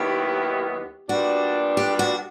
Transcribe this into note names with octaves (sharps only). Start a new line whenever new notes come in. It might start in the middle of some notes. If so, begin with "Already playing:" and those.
Already playing: D#2 D#3 F#3 B3 E4 G4
A#2 G3 B3 D4 F#4
G4
F#4